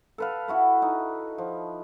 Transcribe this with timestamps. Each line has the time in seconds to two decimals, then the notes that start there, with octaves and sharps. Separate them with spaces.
0.18 A4 B4 F5
0.48 E4 F#4 B4
0.82 D#4
1.38 F3